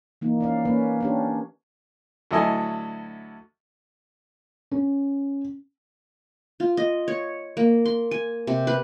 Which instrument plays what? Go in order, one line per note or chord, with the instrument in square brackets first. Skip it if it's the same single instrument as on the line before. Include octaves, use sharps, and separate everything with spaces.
[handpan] E3 A#3 D#4
C#4 D5 F5
A#3 C#4 B4
C#4 D4 G4
[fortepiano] D2 F#3 E4 A4 D#5 G#5
[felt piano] C#4
[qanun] F4
D#5
C#5
A#3
C6
G#5
C3
B4